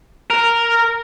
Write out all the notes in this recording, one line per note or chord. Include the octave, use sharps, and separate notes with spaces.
A#4